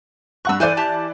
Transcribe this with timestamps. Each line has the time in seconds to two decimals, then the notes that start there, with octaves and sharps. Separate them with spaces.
0.45 G2 F#5 C#6 E6 F#6
0.60 E3 A4 C5 D5 G#5
0.77 G4 A5